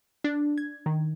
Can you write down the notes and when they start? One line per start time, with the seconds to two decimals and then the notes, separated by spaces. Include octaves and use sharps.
0.24 D4
0.58 G#6
0.86 D#3